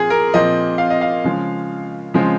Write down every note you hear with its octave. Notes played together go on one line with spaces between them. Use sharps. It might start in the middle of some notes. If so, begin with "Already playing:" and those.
Already playing: A#2 F3 C4 G#4
A#4
A#2 F3 C4 D#5
F5
D#5
F5
C#3 F3 G#3
C#3 F3 G#3 C4